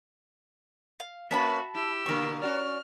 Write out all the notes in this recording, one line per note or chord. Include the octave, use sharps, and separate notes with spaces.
F5
A#3 C#4 F#4 B4 E5 A5 B5
E4 G4 E6
B2 D3 A#3 A#4 C#6
C#4 F#4 D5 F6